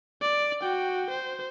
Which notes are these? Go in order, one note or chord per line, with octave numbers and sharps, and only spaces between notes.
D5
F#4 G5
C5